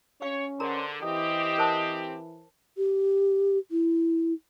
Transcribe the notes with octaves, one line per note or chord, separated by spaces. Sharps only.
C#4 G4 C#5 F5 C#6
D3 G#4 A#4 C5 A#5
E3 C4 G4 D#5
A#4 C5 A5
G4
E4